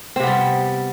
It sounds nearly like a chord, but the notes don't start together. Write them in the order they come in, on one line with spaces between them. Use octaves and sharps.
C4 C3 B3 G3